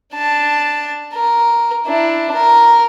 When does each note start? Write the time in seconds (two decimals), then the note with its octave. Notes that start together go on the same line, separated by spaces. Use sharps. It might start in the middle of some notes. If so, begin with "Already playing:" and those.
0.14 D4 A5
1.13 A#4
1.86 D4 E4
2.35 A#4